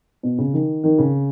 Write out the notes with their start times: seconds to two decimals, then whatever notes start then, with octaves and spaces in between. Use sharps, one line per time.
0.23 B2
0.38 C#3
0.53 D#3
0.84 D#3
0.98 C#3